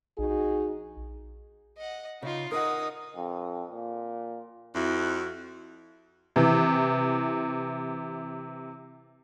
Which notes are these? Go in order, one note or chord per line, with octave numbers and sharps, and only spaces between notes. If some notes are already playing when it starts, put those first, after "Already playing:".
A#1 D#4 F#4 G#4
D#5 F#5
C#3 D#4 F4
D#4 A#4 D#5 F#5 D#6
F2
A#2
F2 E4 F#4
C3 E3